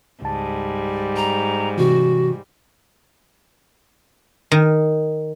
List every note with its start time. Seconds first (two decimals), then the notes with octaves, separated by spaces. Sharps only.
0.22 C#2 G#2 G3 A5
1.16 A#5
1.77 C3 E3 F#4
4.52 D#3